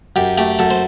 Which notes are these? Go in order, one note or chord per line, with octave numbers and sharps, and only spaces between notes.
F#2 G4
A3 G4
F#2 A4
C5